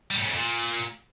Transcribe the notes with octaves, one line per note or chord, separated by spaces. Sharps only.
G3
A2
C#3
F2
A#2